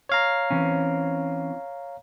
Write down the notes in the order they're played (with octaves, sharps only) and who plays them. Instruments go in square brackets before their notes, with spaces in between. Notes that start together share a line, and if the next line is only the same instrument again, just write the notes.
[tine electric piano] C#5 F5 A#5
[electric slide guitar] E3 C4 C#4